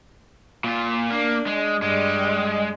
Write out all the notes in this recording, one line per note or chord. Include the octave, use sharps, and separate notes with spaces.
A#2 F4
A#3 D4
G#3
G2 G3 G#3